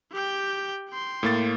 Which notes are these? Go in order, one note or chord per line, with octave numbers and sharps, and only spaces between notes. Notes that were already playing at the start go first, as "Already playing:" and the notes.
G4 G5
G5 C6
A2 A#3 A6